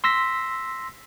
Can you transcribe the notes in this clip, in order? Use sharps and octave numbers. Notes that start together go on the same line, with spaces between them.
C6 E6 A#6 B6